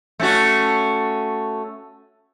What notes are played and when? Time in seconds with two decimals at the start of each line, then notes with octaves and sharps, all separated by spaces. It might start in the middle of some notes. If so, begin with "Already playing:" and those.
0.19 A3 C#4 F#4